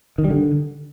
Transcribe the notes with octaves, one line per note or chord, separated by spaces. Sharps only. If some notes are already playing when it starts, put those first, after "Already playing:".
D#3
G3
D3